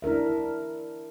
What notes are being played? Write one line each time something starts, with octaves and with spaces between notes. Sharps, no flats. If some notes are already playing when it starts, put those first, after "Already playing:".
D4 E4 A#4 E5